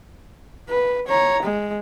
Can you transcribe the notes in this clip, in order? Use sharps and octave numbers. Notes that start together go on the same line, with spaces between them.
B4
C#5 A#5
G#3